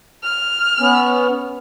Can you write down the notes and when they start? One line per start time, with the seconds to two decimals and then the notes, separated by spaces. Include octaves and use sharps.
0.23 F6
0.80 B3 C#4